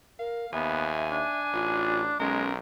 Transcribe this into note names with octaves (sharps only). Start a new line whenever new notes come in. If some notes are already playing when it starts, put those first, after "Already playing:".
A#4 F5
D#2 B3 E5 G#5
D4
A1 F4
B1 G#3 C#4 A#4